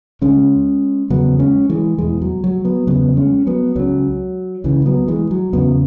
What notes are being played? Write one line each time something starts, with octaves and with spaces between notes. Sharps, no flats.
C#2 C#3 G#3 C#4
E2 C#3 F#3 B3
G#3 C#4
E3 G#3
E2 B2 E3 G#3
F#3
F#3
F#3 B3
E2 C#3 F#3 B3
G#3 C#4
F#3 B3
C#2 C#3 F#3
C#2 C#3 E3
F#3 B3
E3 G#3
F#3
E2 C#3 F#3 B3